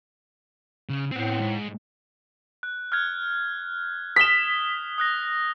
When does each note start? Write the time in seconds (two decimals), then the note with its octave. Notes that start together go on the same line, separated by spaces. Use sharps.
0.89 C#3
1.11 A2 B3 C4
1.39 G#2
2.63 F#6
2.92 F6 F#6 G#6
4.16 D#6 B6 E7 G7
4.98 D#6 F#6 A#6